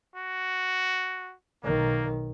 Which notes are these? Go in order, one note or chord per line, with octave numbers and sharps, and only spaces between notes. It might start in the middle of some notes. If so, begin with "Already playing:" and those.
F#4
B1 D#3 A#3